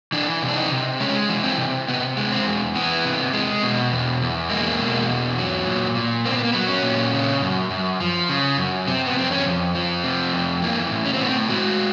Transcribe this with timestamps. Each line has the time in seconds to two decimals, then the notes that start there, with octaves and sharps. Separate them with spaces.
0.12 E3 D4
0.42 C3
0.48 D4
0.56 D#4
0.72 C3
1.00 G#3 C#4
1.29 E3
1.44 C4
1.58 C3
1.88 C3 B3
2.17 G#3
2.32 C4
2.46 E2
2.75 E3 B3
3.05 C3
3.33 G#3
3.63 B2
3.92 E2
4.22 E2
4.50 G#3 A#3
4.79 B2
5.08 E2
5.38 F#3
5.66 A#2
5.95 A#2
6.25 A#3 C4
6.34 B3
6.44 A#3
6.53 F#3 B3
6.69 C#4
6.83 A#2
7.13 C#3
7.42 F#2
7.70 F#2
8.00 F3
8.29 C#3
8.58 F#2
8.88 C3 C4
9.06 B3
9.16 F2 C4
9.31 C#4
9.46 F2
9.75 F3
10.04 C3
10.33 F2
10.62 E3 A#3
10.92 A2
11.05 C#4
11.13 C4
11.20 A2 B3
11.29 C4
11.50 G#3 F#4